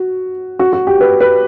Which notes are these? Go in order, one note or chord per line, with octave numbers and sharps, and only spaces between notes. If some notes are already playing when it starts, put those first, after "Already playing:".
Already playing: F#4
F#4
F#4
G4
B4
B4